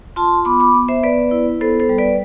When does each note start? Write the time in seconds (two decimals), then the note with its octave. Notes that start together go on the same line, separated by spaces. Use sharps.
0.16 F4 A5 C6
0.45 B3 B5 D6
0.60 B5 D6
0.74 B3
0.88 C5 E5
1.03 B3 B4 D5
1.31 E4
1.61 B3 A4 C5
1.80 A4 C5
1.89 G3
1.98 B4 D5